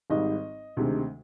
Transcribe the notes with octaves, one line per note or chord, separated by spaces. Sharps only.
G#1 G#2 G3 D#5
D2 C3 D#3 G#3